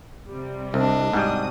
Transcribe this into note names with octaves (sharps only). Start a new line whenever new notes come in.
C3 G3
C2 D4 D#5
G#2 C3 G3 F#4 D#6